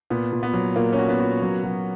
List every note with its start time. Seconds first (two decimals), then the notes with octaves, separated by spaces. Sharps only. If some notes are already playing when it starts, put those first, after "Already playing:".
0.10 A#2 B3
0.32 A#2
0.43 B3
0.53 F#3
0.76 A#2 A#3
0.93 C#4
0.98 F#4
1.09 B3
1.20 F#4
1.42 F#3
1.64 F#3